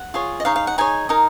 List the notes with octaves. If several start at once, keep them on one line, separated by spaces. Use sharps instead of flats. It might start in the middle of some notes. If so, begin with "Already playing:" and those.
Already playing: F#5
F4 G#4 C#5
D#5
D#4 G#4 C#5 F5
F5
F#5
D#4 G#4 C#5 G#5
D#4 A#4 D#5